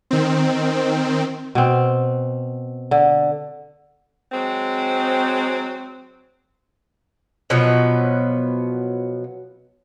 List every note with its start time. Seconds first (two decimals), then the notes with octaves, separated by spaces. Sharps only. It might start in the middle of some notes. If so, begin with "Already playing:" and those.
0.11 D#3 C4
1.55 B2 C4
2.91 D3
4.32 F#3 G#3 C4
7.50 B2 F3 F#3 B3